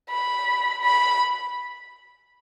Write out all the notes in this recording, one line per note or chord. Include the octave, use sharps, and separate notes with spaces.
B5
B5